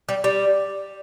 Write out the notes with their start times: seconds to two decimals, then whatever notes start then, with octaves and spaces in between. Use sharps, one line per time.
0.09 G3
0.24 G3